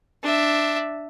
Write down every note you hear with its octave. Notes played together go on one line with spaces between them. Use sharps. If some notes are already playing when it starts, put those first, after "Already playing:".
D4 E5